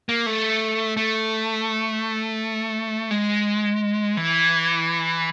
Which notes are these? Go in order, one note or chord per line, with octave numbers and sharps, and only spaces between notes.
A#3
A3
A3
G#3
E3